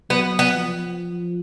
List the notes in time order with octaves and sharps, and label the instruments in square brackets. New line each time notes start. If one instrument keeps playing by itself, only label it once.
[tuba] F#3 [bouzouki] B3
[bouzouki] B3
[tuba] F3